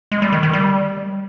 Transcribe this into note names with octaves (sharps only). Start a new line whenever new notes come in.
G#3
G3
D#3
D#3
G3